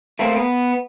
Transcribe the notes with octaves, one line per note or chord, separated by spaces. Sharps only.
A3 A#3 C4
B3